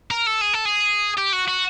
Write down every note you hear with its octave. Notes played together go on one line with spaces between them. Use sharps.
A#4
A4
G#4
A4
G#4
G4
F#4
F#4